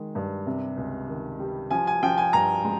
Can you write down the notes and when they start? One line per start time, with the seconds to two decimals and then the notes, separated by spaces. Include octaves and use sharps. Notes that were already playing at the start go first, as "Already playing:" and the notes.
Already playing: D#3 G#3
0.15 G2
0.46 C3
0.77 C#2
1.08 D#3
1.39 G3
1.71 F3 G#5
1.87 G#5
2.03 F3 G5
2.18 G#5
2.33 G2 A#5
2.64 G#3